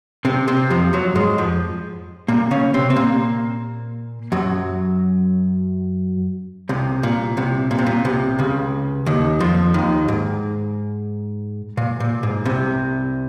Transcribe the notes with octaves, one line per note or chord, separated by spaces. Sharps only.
C3 C4
C3 C4
F2 F3
F#2 F#3
G#2 G#3
F2 F3
A#2 A#3
C#3 C#4
C3 C4
C4
A#2 A#3
F#2 F#3
C2 C3
A#2
C2 C3
A#2
C3
A#2
C2 C3
C#2 C#3
D#2 D#3
F2 F3
D#2 D#3
G#2
A#2
A#2
G#2
C2 C3